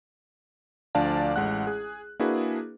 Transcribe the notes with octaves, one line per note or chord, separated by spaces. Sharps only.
D2 F3 D4 D5 F5 A5
A1 G#3 F#5 F#6
G#4
A#3 D4 E4 F#4 G#4 B4